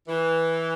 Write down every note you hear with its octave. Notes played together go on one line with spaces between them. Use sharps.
E3